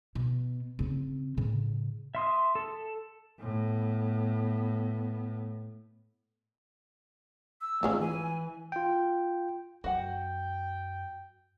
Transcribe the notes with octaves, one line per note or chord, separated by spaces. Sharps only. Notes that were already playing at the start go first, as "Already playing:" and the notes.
B2
C#3 C4
A2 C#3
E5 C6 D#6
A4
A2 B3
E6
G#1 C#2 F3 G#3 A3 C#4
E3 G#5
F4 G5
F#2 F#4 F#5 G5